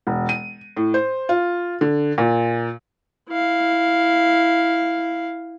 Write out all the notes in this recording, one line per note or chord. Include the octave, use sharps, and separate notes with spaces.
E1
D#7
A2
C5
F4
D3
A#2
E4 F5